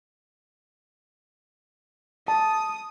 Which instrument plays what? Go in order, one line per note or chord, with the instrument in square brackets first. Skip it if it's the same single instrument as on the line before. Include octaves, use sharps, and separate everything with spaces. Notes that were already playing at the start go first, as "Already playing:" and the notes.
[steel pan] A5 [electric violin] D#6